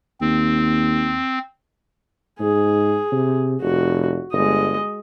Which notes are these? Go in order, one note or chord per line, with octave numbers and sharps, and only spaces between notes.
D#2 C4
G#2 G#4
C3
F1 F#4
G1 G#3 D#5